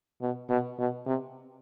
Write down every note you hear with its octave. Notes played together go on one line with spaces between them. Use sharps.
B2
B2
B2
C3